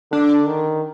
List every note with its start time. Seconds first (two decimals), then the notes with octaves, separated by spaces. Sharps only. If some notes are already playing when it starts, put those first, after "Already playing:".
0.12 D3 D4
0.46 D#3